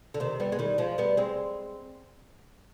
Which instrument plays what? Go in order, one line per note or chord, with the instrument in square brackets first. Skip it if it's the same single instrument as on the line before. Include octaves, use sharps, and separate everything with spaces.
[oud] D3
C3 D#3
G3 B3
G#3
D#3 G3
F3 G#3
G3 B3
G#3 C4